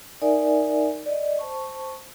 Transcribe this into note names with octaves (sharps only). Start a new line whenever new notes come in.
D#4 A#4 D5 E5 G#5
D5 D#5
C5 A5 C#6